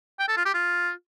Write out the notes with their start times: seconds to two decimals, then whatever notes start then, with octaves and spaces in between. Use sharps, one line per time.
0.19 G5
0.28 A4
0.37 F4
0.45 G4
0.54 F4